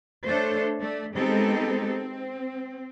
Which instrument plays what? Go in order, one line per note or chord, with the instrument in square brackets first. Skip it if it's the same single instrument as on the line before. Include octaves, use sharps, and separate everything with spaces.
[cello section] A3 D4 A4 C5 C#5
A3 D5
G#3 B3 C4 D#4 G4 A4
C4